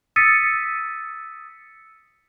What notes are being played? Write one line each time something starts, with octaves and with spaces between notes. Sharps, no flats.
D#6 E6 A6 B6 C#7 D#7